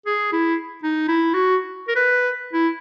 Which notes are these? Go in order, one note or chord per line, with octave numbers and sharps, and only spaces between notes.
G#4
E4
D#4
E4
F#4
A#4
B4
E4